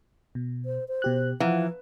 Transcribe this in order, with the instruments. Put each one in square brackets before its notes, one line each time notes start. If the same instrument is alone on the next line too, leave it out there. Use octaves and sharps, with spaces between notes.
[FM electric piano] B2
[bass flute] C5
C5
[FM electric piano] B2 G4 F#6
[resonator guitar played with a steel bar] E3 [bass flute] F3 [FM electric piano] F5 F#5 A#5